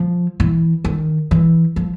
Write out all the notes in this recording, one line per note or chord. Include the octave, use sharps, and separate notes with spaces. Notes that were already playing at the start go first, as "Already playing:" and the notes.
Already playing: F3
E3
D#3
E3
F3